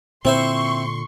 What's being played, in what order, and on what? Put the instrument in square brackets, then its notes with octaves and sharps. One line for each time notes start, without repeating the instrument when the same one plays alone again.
[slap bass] A#2 D3 [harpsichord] C4 E4 C5 [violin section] C6 C#6